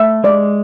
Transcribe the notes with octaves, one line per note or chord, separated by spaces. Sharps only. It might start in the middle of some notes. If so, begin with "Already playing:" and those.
Already playing: A3 E5
G#3 D5